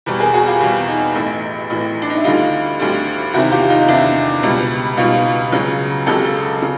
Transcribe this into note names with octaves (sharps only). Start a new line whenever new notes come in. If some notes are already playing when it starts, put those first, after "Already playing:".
E2 B2 G3
G#4 A#4
F#4 G#4
F4 G4
E2 B2 G3
D#4
A1 A2 E3
A1 A2 E3
D4
D#4
E4
D2 D3 G3 D#4 F4
D2 D3 G3
E2 C3 D#3 E4 F#4
F4 G4
D#4 F4
E2 C3 D#3 D4 E4
C#2 B2 G3
C#2 B2 G3 D#4 F4
C#2 C#3 F#3
C#2 C#3 F#3 G4 A4
C#3